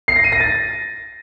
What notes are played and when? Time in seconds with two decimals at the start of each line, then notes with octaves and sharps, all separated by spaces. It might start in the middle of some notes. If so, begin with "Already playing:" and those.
0.08 C7
0.16 A#6
0.24 D#7
0.32 A#6
0.40 A6